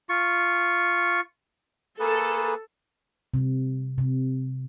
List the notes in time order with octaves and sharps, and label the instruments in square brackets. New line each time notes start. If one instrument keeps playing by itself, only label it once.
[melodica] F4 C#6
[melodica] A#3 G#4 B4 [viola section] A4
[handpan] C3
C3